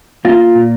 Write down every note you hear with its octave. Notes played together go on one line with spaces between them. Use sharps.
A#3 F4
A#2